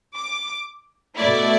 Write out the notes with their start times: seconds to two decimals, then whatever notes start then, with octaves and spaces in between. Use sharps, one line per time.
0.18 D6
1.18 B2 A3 E4 D5